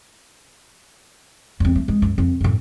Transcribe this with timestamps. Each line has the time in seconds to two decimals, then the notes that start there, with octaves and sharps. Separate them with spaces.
1.60 E2 C4
1.76 A3
1.88 G#3
2.02 F#2
2.18 F2
2.41 F#2 A2